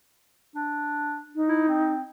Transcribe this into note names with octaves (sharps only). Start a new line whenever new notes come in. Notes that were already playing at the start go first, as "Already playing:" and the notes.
D4
D#4
E4
C4